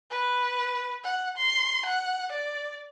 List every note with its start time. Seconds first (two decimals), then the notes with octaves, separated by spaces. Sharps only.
0.11 B4
1.04 F#5
1.37 C6
1.85 F#5
2.32 D5